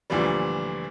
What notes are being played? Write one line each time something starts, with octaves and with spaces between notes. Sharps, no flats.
D2 A#2 E3 F3 G3